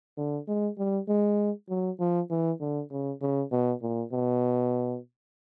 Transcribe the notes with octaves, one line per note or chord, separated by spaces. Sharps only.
D3
G#3
G3
G#3
F#3
F3
E3
D3
C#3
C#3
B2
A#2
B2